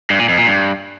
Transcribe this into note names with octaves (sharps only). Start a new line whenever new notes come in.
G2
A#2
F2
A#2
G2